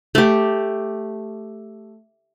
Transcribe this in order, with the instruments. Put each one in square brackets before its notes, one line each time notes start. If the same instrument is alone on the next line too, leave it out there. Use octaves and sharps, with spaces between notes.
[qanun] A3 G4